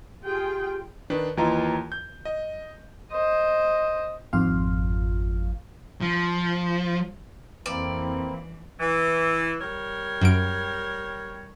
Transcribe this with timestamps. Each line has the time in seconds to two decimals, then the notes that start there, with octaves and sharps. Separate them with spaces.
0.24 F4 G4 G#4 G5
1.10 D#3 D4 B4
1.37 D#2 E3 F4 D#5 A#5
1.92 G6
2.25 D#5
3.11 C5 D#5
4.33 G#1 F2 G#2 F4 F5
6.01 F3
7.66 F2 E3 A#3 C4 E4 D5
8.80 E3
9.61 G3 A#4 C#5
10.21 F#2 D7